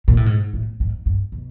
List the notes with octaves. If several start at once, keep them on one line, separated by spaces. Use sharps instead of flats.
A#2
A2
G#2
A2
G#2
G2
B2